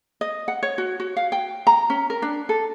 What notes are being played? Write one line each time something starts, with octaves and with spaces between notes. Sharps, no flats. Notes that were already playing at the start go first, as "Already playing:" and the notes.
D#5
F#5
C#5
F#4
F#4
F5
G5
A#5
C#4
A#4
D4
A4